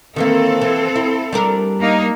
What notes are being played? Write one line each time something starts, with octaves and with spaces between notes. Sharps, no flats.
D#3 E3 A#3 C4 A4
E3
E4
G3 D4 A#4
A#3 D#4